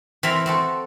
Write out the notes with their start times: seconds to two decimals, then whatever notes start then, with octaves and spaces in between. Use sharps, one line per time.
0.23 E3 C4 A#4 C5 E5 A#5
0.46 C4 F#4 A4